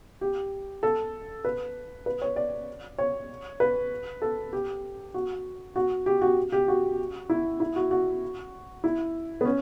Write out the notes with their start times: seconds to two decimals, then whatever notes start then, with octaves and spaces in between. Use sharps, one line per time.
0.21 G4
0.83 A4
1.45 B4
2.06 B4
2.22 C#5
2.36 D5
2.98 C#5
3.60 B4
4.22 A4
4.53 G4
5.14 F#4
5.76 F#4
6.06 G4
6.22 F#4
6.52 G4
6.68 F#4
7.29 E4
7.60 E4
7.76 F#4
7.91 F#4
8.84 E4
9.41 B3
9.45 C#4